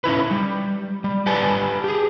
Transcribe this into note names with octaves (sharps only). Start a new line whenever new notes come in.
C#4 D#4 E4 B4
G3
G3
G4 B4 D5 G#5 A5
G4 G#4